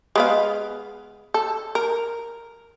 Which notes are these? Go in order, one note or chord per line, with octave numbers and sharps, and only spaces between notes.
G#3 B3 F5
A4
A#4